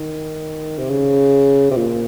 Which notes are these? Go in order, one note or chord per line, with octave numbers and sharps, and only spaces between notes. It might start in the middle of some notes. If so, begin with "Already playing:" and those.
Already playing: D#3
C3
C#3
C3
A#2